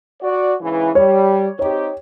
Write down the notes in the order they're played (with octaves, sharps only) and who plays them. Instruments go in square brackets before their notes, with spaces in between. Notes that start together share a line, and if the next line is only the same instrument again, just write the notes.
[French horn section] F#4 D5
G#2 C#3 E3
[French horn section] G3 [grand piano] C#5
[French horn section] C4 D#4 G4 [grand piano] C#5